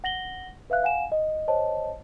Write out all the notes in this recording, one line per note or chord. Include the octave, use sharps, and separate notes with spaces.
F#5 A#6 F#7 G7
B4 E5 F5 F#6
F5 F#5 G#5 E7
D#5
C5 C#5 D#5 A5